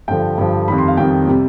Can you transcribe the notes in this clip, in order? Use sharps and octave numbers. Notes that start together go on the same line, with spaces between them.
G2 D3 F3 G5
G2 D3 F3
F2 D#3 G3 B5
C6
F5
F2 D#3 G3 G5
C3 G3